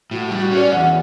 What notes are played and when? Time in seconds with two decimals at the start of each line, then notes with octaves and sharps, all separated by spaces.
0.11 A2 F#4
0.26 G3 G4
0.42 F#4
0.51 C#4
0.57 D5
0.72 E2 F#5